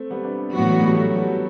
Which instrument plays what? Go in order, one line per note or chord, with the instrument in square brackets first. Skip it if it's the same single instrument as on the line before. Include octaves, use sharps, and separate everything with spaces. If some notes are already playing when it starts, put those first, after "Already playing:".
Already playing: [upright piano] A3 C4
G3 B3
B3 D4
[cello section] A2 E3 B3 F#4 [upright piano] F#3
[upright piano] F#3
G3
F#3 A3
G3 B3